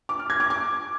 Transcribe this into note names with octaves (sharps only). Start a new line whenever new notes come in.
D6
F6
G#6
D6
D6